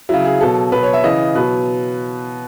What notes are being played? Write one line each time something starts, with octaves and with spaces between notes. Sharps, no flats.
C#3 F#3 E4
G#4
B2 F#3 A4
B2 F#3 B4
C#5
E5
C#3 E3 D#5
B2 F#3 B4